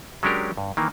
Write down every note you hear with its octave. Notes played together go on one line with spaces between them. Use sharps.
F#3 G#3 C#4 D4 G4 A#4
G2
D#3 E3 A#3